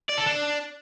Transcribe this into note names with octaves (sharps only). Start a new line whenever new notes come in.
D5
A4
D4